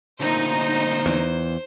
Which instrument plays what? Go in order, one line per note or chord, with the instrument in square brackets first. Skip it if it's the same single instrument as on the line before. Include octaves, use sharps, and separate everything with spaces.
[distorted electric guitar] D2 A#2 [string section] D#4 [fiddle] C5
[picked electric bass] E2